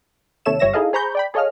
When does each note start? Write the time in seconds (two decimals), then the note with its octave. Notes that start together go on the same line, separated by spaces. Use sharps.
0.45 D#2 C3 A4 C#5 E5 E7
0.59 G1 G3 C#5 E5 A#6 E7
0.73 D#4 E4 G#4 A4 D#5 F5
0.93 G#4 C5 A#5 B5 C#6 G6
1.15 D5 G5 B5
1.34 G#4 A4 C#5 D#5 F5 F6